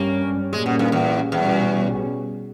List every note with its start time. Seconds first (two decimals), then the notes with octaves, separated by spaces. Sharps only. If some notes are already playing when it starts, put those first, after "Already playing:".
Already playing: G2 G3 A#3 C#4
0.52 A#2 G3 G#3 A#3 C#4
0.66 B2
0.79 G2
0.92 E2
1.32 E2 B2 G3 C#4